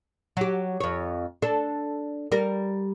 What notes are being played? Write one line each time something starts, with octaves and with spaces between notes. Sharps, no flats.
F#3 G4
F2 C#5
D4 A4
G3 A#4